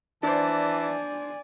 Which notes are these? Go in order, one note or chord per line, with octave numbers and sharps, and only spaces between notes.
E3 D4 C5 D5 G#5 A5